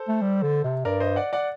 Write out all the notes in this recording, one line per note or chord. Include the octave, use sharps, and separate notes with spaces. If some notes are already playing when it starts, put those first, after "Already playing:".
Already playing: A4 C5
A3
G3
D3
C3
G2 A#4 D5
C5 D#5
D5 F#5
D5 F#5